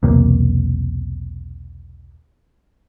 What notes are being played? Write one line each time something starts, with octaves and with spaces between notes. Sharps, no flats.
B1 E2 C3 A#3